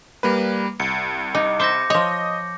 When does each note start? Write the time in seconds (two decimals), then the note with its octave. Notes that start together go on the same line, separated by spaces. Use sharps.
0.23 G3 A#3 B4
0.80 C2 C#7
1.35 D#4 D6
1.60 C5 E5 D6 G6 A#6
1.90 F3 C#5 D#5